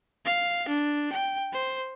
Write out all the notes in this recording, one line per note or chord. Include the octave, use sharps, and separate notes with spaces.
F5
D4
G5
C5